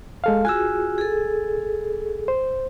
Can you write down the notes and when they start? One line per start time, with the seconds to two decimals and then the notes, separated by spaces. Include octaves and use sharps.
0.24 G#3 A4 F5
0.45 F4 F#4 G#4 G#5 E6
0.98 G#4 A4
2.28 C5